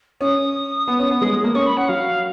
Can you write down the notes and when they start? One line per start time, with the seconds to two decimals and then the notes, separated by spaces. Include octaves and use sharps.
0.21 C#4 D#6
0.88 B3
0.99 C#4
1.11 B3
1.22 G#3
1.33 G#3
1.44 A#3
1.55 C#4 C#6
1.66 B5
1.77 C#4 F#5
1.89 F#3 F5